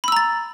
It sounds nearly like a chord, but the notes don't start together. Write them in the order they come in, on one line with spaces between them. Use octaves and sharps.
B5 E6 A#5 A6